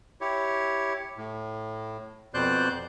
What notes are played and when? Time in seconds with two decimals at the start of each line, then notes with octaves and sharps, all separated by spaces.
0.21 E4 G4 C#5
1.18 A2
2.34 F2 B2 C5 D5 F#6 G6